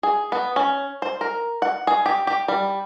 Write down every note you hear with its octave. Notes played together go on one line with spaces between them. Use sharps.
G#4
B3
C#4
C5
A#4
F#5
G#4
G4
G4
G3